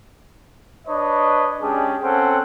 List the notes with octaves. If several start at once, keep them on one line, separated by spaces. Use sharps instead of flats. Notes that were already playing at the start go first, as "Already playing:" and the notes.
D4 B4 C#5 D#5
G#3 C#4 D4 G4 G#4
C4 C#4 A4 F#5 G5